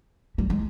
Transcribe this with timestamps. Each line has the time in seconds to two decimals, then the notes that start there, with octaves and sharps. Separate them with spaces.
0.38 G3
0.50 G#3